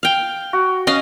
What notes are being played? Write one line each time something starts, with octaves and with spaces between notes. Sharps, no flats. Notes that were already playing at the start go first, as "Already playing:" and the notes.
F5 G5
F#4
C#4 D#5 F5